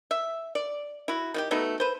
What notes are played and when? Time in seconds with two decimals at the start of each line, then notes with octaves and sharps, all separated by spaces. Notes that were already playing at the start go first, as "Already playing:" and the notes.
0.11 E5
0.55 D5
1.08 E4 F#4
1.34 D#3 F#4 G4
1.51 F#3 A3 B3 D#4
1.80 B4 C5